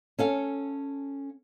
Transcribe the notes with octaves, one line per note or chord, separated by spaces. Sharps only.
C#4 A4 F5